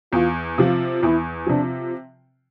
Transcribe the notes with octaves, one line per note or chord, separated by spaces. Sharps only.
E2 F4
C3 F3 F4
E2 E4
C3 F3 D4